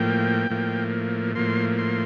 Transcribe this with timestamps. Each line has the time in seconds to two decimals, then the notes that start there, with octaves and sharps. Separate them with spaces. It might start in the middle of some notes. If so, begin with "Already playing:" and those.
Already playing: A2 F3 A#3 G5
0.50 A2 F3 A#3
1.35 A2 F3 A#3 C6
1.78 C6